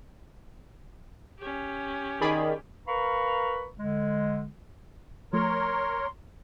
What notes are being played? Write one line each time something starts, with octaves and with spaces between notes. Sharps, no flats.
C#4 G4
D#3 G#4 D5 B5
A#4 B4 F5 A#5 B5 C#6
D3 G#3
F3 A3 A#4 C#5 C6